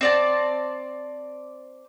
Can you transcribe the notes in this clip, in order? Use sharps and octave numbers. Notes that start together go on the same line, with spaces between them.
C4 D5 A5